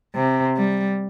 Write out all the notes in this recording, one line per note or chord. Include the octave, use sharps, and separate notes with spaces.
C3
G3